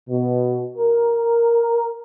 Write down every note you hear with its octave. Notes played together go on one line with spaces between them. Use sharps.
B2
A#4